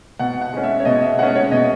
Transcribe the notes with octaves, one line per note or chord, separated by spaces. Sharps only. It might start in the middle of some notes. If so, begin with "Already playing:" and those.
B2 F#5
F#5
G#3 C#4
E5
C#5
B2 D#5
E5
G#3 C#4 F#5
C#5
B2 D#5